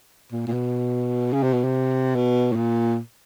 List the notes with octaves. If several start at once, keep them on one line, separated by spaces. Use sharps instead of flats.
A#2
A#2
B2
C#3
C3
B2
C3
B2
A2
A#2